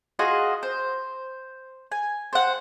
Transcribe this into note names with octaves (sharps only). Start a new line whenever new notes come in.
F4 F#4 G#4 D#5
C5
G#5
C5 F#5